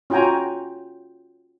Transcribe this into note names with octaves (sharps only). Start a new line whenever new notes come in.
C#4 F4 F#4 G5 G#5 A#5